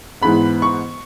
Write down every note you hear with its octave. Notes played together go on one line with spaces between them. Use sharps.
G#2 E3 B3 B5
C#6